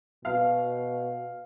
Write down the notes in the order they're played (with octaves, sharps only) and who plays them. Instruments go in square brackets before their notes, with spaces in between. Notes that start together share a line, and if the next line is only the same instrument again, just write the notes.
[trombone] B2 [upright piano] F5